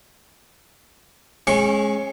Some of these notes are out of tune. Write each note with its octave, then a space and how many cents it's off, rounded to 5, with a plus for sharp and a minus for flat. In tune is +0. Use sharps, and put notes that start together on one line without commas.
G#3 +10 C#4 -30 C#6 +0